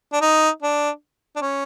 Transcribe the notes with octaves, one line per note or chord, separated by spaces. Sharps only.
D4
D#4
D4
D4
C#4